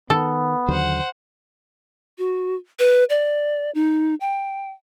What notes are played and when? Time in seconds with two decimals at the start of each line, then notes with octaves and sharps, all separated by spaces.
0.10 D#3 B3 A4
0.69 D#2 D3 F#3 C5 F#5
2.18 F#4
2.79 B4
3.10 D5
3.75 D#4
4.20 G5